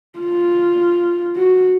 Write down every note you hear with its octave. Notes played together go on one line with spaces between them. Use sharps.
F4
F#4